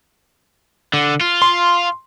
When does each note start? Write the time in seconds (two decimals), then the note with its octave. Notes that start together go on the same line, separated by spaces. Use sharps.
0.94 D3
1.21 F4
1.42 C6